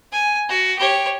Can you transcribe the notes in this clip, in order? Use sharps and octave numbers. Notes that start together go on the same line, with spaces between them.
G#5
F#4
G4 C#5